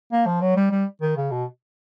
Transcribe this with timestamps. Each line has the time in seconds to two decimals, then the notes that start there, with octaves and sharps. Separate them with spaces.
0.12 A#3
0.26 F3
0.41 F#3
0.56 G3
0.71 G3
1.01 D#3
1.17 C#3
1.31 B2